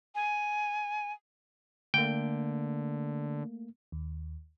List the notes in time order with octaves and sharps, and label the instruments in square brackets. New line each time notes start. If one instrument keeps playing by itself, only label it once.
[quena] G#5
[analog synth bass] D3 [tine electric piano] A3 A#3 [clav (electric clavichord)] G5
[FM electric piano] D#2